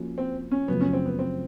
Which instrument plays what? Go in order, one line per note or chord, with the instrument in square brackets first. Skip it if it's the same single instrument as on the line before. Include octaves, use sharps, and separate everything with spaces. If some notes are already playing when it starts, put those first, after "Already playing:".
Already playing: [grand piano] F3 A#3 C#4 F#4
[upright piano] C4
C#4
[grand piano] F#2 C#3 F3 A3 [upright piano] B3
[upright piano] C#4
C4
B3
C4